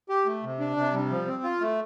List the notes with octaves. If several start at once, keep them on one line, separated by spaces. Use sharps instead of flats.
G4
A3
C3
D4
C3
G3
F3
C4
F4
A3